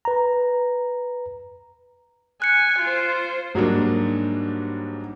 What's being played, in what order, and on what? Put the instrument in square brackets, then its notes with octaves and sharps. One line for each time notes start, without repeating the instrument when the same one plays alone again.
[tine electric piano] B4 A#5
[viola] G#5 [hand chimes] F#6 C#7
[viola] F4 C5
[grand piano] G#2 F#3 G3 A#3 D4